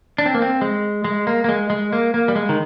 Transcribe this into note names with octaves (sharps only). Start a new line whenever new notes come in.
D4
C4
A#3
C4
G#3
G#3
A#3
A#3
G#3
G#3
A#3
A#3
G3
G#3
D#3